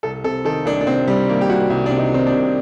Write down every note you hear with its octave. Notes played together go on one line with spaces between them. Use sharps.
C2 A4
C3 A4
D#3 A4
C2 D4
D4
C2 C4
C3 G3
D#3 A#3
G4
C2 F#4
C2
D4
C3
D#4
D#3 C4
D4
C2